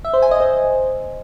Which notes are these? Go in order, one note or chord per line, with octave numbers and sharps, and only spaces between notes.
E5
C5
G#5
D#5
C5